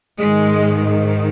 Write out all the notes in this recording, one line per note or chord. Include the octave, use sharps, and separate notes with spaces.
G#2 D#3 G#3